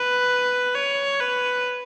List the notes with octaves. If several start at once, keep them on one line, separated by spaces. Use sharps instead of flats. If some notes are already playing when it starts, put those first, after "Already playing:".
Already playing: B4
C#5
B4